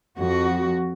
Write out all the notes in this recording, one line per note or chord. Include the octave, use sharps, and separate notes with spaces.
F2 F#4